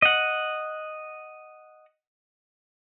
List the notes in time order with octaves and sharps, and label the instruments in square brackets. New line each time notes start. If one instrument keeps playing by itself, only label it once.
[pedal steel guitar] D#5 F#5